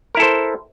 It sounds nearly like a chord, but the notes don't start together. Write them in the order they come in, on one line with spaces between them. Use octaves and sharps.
A#4 E4 A4 C5